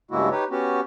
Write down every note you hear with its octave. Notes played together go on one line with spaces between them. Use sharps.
G2 C#3 G#3 A#3 E4 F#4
D#4 G4 B4 C#5
B3 C#4 F#4 G4